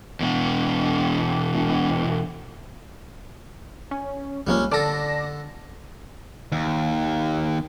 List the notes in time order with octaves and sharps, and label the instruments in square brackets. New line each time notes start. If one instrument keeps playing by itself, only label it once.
[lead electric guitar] E2 B2
[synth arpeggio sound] C#4
[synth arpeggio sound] C#2 F3 A#3 [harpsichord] G3 G#3 C#4
[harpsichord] D3 A4 [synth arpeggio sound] D5 A5 A#6
[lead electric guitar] D#2